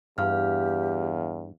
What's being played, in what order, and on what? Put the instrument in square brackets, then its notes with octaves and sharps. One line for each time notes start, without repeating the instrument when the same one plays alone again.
[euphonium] E2 [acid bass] G2 [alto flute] G4 [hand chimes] F5 F6